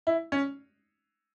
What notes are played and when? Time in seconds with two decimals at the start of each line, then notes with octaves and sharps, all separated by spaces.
0.07 E4
0.32 C#4